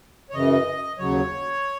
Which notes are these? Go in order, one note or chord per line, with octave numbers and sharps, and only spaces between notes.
C#5
F#2 C#3 E3 D#5
D#2 C#3 F#3 C#5